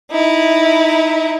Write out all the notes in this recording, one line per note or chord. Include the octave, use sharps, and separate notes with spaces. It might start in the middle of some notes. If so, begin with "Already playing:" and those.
D#4 E4